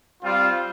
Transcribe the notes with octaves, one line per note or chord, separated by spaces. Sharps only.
G3 C4 F4